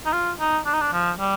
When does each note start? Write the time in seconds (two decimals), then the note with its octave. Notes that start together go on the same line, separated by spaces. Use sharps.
0.06 D#4
0.13 F4
0.40 D#4
0.66 D4
0.74 D#4
0.81 D4
0.93 F3
1.19 G3